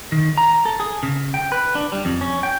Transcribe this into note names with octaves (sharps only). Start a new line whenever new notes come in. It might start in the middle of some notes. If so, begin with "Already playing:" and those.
D#3
A#5
A4
G#4
C#3
G5
B4
D4
G3
F2
C#4
G5